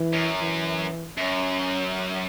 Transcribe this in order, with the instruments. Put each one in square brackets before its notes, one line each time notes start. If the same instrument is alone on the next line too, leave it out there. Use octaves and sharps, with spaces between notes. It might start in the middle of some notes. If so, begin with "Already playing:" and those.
Already playing: [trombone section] E3
[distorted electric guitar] F#2
[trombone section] E3
[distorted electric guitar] F#2 [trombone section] C#4